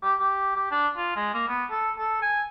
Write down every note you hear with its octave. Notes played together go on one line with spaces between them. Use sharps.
G4
G4
G4
D4
F4
G#3
A#3
B3
A4
A4
G#5